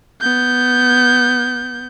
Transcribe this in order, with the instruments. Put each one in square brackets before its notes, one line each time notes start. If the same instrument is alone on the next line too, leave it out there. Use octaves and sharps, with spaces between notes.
[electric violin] B3 G6